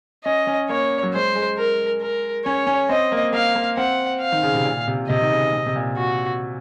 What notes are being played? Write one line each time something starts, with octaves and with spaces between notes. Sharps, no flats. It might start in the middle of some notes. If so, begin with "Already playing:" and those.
C#4 D#5
C#4
A#3 C#5
F#3
G#3 C5
G#3
A#4
A#4
C#4 C#5
C#4
C4 D#5
A#3
A#3 F5
A#3
C4 F#5
F5
D#3
C#3
C3
A#2
C3
C3 D#5
D#3
C#3
C3
C3
A#2
F#4